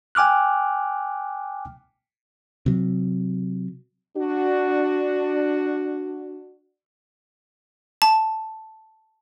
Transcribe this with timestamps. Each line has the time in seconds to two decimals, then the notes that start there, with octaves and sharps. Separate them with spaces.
0.15 G5 G#5 D6 F6 F#6
2.66 C3 F#3
4.17 D4 F#4
8.02 A5